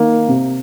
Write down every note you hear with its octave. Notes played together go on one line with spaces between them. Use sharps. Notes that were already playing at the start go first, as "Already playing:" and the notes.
Already playing: D#3 A#3
C3